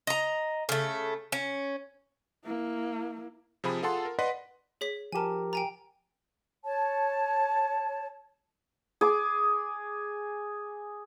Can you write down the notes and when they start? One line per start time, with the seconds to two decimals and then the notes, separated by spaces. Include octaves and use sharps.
0.07 D#5 A#5
0.69 C#3 A3
1.32 C#4
2.45 A#3 E4
3.64 C3 F3 G#4 B5
3.83 F4 G#4 A4 F#5 A5 C6
4.05 A#4
4.19 B4 D5 D#5 F#5 C6 B6
4.81 G#4 C#5 B6
5.12 F3 G4 A#4 G#5 A5
5.53 G5 G#5 A#5
6.64 C#5 A5
9.01 G#4 D6